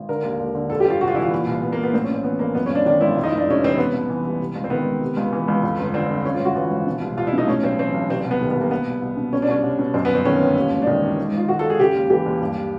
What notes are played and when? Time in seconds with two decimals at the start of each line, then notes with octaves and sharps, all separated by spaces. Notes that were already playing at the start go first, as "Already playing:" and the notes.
Already playing: G#1
0.09 D3 A#4
0.23 D#2
0.40 D#2
0.55 D3
0.70 F2 A4
0.80 G4
0.86 G1 F4
1.00 C3 F#4
1.08 F4
1.15 E3 E4
1.22 F4
1.32 A#2
1.47 C2
1.62 C2 B3
1.73 A#3
1.78 A#2
1.83 B3
1.93 A2 C4
2.04 C#4
2.08 A#1
2.14 C4
2.24 E3 B3
2.39 A#1 A#3
2.55 F#2 B3
2.66 C#4
2.70 G#1 D4
2.86 D#3 D4
3.01 G#1 E4
3.17 F2
3.23 D#4
3.32 F1
3.37 D4
3.48 C3 C#4
3.63 E3 C4
3.78 C3 B3
3.94 C2
4.10 E3
4.24 C2
4.40 C3
4.55 C#2
4.64 C4
4.70 D#3 B3
4.86 C#2
5.01 C3
5.17 C#2
5.32 E3
5.48 C#2
5.63 F2
5.79 G1
5.94 D3 C4
6.09 G1
6.24 G#2 C#4
6.34 F4
6.40 G#1
6.45 F#4
6.55 E3 F4
6.71 G#1
6.87 B2
7.01 C2
7.17 C2 F4
7.27 E4
7.33 B2 D#4
7.48 A2 C#4
7.63 B1 C4
7.79 E3 C4
7.94 B1
8.10 C3 C4
8.20 C4
8.24 C2
8.31 B3
8.41 D#3
8.51 B3
8.55 C2
8.61 A#3
8.71 B2 B3
8.87 C2
9.02 C2
9.17 B2
9.33 B2 C#4
9.42 D4
9.49 C2 C#4
9.63 C2
9.79 B2
9.94 F#2 C4
10.05 B3
10.09 G1
10.15 C4
10.25 D#3 C#4
10.41 G1
10.55 D#2
10.72 E1
10.82 D4
10.87 D#3 D#4
11.02 E1
11.17 G#2
11.33 G#1 F4
11.49 D#3 F#4
11.59 G#1 A4
11.70 G#4
11.79 C#3 G4
11.95 D#2
12.10 E3 G4
12.26 D#2
12.41 G2